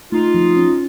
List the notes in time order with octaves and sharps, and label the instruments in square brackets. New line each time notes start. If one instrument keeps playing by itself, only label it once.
[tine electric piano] A3 [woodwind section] D#4 F4
[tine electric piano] F3
C#4